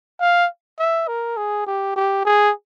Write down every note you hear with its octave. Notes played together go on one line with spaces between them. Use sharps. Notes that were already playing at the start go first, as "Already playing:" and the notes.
F5
E5
A#4
G#4
G4
G4
G#4